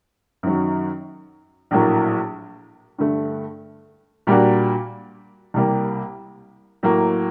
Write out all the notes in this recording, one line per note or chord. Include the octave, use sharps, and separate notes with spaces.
F#2 D#3 F#3
A#1 A2 F#3 A#3
G2 D3 A3
A#2 G3 A#3 D4 F#4
C2 C3 G3 A#3
A2 F#3 A#3